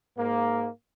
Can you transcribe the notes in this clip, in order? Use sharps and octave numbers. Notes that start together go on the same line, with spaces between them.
G#2 A#3